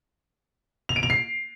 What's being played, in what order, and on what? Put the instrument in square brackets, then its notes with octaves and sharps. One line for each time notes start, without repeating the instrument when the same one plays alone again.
[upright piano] F7
D7
F7
C7